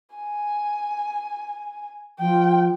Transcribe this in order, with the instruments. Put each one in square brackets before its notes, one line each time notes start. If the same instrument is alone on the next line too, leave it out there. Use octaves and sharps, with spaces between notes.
[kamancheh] G#5
[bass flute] F3 [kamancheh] G5